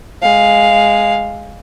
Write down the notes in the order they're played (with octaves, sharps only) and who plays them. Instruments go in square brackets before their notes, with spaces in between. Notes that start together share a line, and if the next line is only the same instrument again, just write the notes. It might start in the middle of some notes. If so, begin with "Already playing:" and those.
[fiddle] G#3 F5